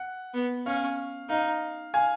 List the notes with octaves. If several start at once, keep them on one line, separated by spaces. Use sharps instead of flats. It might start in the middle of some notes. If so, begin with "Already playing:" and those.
Already playing: F#5
B3
C#4 F5
D#4 F5
F5 G#5